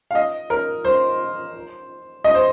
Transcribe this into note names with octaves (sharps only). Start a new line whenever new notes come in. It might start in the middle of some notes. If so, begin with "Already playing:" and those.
F5
D#5
A#4
C5
D#5
C5